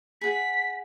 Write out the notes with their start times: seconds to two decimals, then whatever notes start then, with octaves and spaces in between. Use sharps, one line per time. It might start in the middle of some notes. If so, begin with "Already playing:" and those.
0.21 G#4 F#5 B6